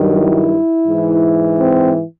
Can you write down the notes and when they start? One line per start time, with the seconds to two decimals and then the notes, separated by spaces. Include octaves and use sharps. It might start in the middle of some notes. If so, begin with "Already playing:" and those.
Already playing: G2 D#3 F#3
0.14 E4
0.87 G#2 E3
1.59 C4